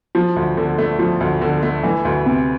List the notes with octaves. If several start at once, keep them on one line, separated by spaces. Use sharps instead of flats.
F3
D2
D3
A3
F3
D2
D3
A3
E3
D2
C3